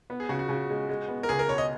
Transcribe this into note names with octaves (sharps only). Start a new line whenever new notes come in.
B3
G#4
C#3 F#4
F#4
C#3
G#3
G#3
B3
A#4
C#2 G#4
A#4
B2 C#5
D#5